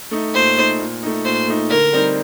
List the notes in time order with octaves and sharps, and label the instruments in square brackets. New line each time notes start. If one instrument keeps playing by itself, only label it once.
[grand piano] A3 D#4
[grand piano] A#2 [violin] C5
[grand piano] A3 D#4
A#2
A3 D#4
[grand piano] A#2 [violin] C5
[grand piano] A3 D#4
[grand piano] D3 [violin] A#4
[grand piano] G3 C4 D#4